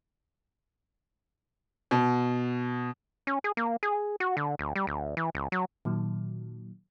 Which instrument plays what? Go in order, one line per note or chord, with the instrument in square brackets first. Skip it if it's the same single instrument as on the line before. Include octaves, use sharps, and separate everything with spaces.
[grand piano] B2
[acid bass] C#4
G#4
A#3
G#4
F#4
D3
D2
G3
D2
E3
C#2
F#3
[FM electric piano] A#2 D#3 F#3